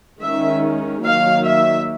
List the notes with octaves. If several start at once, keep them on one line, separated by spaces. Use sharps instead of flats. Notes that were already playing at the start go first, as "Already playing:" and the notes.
D#3 G#3 C#4 E5
D#3 F#3 A#3 F5
E5